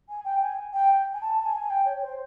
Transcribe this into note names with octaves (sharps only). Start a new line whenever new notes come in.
G#5
G5
G#5
G5
G#5
A5
A5
G#5
G#5
G5
C#5
C5